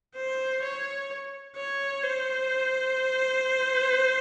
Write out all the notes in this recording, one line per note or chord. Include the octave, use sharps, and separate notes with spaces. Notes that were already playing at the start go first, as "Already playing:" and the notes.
C5
C#5
C#5
C5